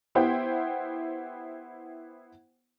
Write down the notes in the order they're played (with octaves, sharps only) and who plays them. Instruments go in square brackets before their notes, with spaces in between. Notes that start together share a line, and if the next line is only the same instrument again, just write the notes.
[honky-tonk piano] B3 E4 G4 C5 F#5 G5